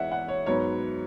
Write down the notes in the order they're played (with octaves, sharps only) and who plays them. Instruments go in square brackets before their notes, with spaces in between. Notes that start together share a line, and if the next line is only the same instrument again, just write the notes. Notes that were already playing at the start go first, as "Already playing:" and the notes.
Already playing: [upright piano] E2 E3 G#3 B3 C#5 E5 F#5
F#5
C#5
G#2 F#3 B3 C#5